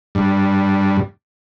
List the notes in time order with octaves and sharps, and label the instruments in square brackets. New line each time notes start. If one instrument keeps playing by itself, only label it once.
[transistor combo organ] G2